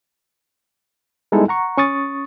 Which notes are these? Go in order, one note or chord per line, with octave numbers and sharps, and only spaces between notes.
G3 G#3 B3 D#4 E4 A4
F#5 A#5 C#6
C#4 C#6 D#6 A6